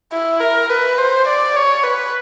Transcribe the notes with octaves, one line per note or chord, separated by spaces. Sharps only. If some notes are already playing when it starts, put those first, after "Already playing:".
E4
A#4
B4
C5
D5
C#5
B4